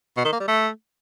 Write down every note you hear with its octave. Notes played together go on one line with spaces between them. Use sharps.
B2
D#3
A#3
G3
A3